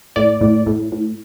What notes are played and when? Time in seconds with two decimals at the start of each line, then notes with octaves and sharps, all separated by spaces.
0.16 A2 D5
0.41 A2
0.66 A2
0.92 A2